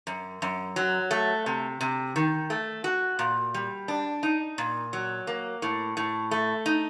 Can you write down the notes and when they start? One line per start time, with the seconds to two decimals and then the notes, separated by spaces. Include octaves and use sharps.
0.07 F#2
0.42 F#2
0.76 F#3
1.11 A3
1.46 C3
1.81 C3
2.16 D#3
2.50 A3
2.84 F#4
3.19 A#2
3.54 G3
3.88 D4
4.23 D#4
4.58 A#2
4.93 F#3
5.27 A#3
5.62 A2
5.97 A2
6.31 A3
6.66 D#4